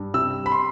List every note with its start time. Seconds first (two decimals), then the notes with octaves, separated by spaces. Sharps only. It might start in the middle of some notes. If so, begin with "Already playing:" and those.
Already playing: G2
0.14 C3 E6
0.46 B5
0.52 C6